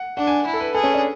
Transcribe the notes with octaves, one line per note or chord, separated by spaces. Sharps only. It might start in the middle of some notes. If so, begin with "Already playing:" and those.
Already playing: F#5
D4 F#5
G#5
E4
A4
B4
G#4 A4
C#4
D4